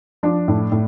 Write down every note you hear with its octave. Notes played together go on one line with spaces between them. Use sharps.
F3 D4
A2
A2